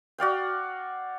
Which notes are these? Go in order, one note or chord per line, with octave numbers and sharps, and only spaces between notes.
F#4 D5 F5 G5